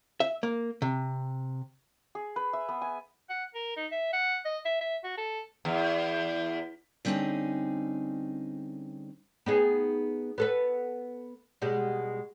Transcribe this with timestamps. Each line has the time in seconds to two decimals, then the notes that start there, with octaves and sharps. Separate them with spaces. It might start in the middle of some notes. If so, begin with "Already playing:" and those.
0.20 E5
0.43 A#3
0.82 C3
2.15 G#4
2.36 B4
2.53 E5
2.69 B3
2.82 G#5
3.30 F#5
3.55 A#4
3.77 D#4
3.92 E5
4.13 F#5
4.45 D#5
4.65 E5
4.81 E5
5.04 F#4
5.18 A4
5.65 E2
7.05 D3 G3 C4 C#4 D#4 G#4
9.46 B3 D#4 G#4
10.38 B3 A4 B4
11.62 B2 G3 G#3